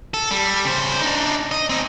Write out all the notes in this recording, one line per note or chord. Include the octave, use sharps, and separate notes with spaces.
A4
G3
C#3 C5
D4 D#4
D#5
C4 D#4